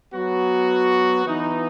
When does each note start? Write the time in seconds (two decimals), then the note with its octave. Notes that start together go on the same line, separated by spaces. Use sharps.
0.13 F#3 B3 F#4
1.26 E3 B3 D#4